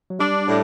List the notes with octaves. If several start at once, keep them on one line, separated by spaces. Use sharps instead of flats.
F#3
G3 D4
A2